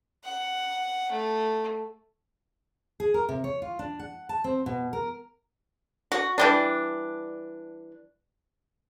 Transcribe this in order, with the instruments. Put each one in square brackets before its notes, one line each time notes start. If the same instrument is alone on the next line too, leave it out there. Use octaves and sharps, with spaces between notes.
[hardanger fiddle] F#5
A3
[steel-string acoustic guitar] G#4
A#4
C3
C#5
F4
D4
F#5
A5
C4
B2
A#4
[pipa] F#4
E3 G3 D4